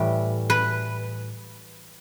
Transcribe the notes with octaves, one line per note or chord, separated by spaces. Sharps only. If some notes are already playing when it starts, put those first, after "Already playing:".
Already playing: A2 E3 G3
B4